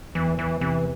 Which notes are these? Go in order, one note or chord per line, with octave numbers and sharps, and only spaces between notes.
E2 E3
E3
C3 E3